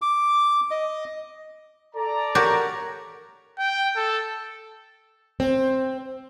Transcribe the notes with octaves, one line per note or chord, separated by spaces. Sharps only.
D6
D#5
A4 D5 A#5
F#4 G4 A#4 C#5
G5
A4
C4